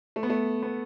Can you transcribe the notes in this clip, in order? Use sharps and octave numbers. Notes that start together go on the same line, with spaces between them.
A3
B3
A3
B3